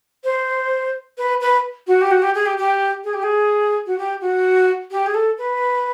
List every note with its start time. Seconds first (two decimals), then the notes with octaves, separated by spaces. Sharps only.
0.24 C5
1.18 B4
1.41 B4
1.87 F#4
2.01 G4
2.11 F#4
2.22 G4
2.35 G#4
2.46 G4
2.58 G4
3.04 G#4
3.14 G4
3.23 G#4
3.86 F#4
3.98 G4
4.21 F#4
4.91 G4
5.06 G#4
5.14 A4
5.38 B4